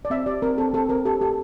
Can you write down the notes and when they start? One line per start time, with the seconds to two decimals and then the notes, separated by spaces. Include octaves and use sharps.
0.05 D5
0.10 C4 E5
0.26 G4 D5
0.42 C4 A#4
0.58 C4 A4
0.74 C4 A4
0.89 C4 A#4
1.05 G4 A4
1.21 G4 A4